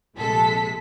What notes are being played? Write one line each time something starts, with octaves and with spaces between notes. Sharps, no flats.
A#1 C3 G#3 A4 B6